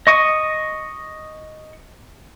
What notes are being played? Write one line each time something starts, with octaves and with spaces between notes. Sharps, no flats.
D#5 C#6 D#6